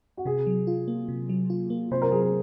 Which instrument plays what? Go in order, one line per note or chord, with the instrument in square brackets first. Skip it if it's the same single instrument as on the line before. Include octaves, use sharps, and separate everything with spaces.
[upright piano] F#4
[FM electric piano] C3 [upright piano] G#4
[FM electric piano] F#3
F4
A#3
C3
F#3
F4
A#3
[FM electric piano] C3 [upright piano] C5
[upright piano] A#4
[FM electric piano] F#3 [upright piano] G#4
[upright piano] A#4